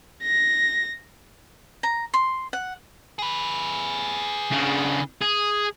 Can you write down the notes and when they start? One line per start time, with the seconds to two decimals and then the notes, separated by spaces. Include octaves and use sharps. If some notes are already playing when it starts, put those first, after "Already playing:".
0.23 A#6
1.83 A#5
2.14 C6
2.53 F#5
3.19 G#4 B4
4.52 C#3 D4
5.21 G#4